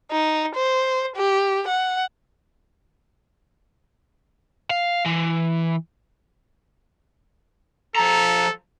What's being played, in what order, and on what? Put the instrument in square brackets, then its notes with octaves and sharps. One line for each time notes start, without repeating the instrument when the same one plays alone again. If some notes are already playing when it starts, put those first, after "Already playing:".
[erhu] D#4
C5
G4
F#5
[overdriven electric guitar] F5
E3
[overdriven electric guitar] F3 A#5 [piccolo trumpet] A4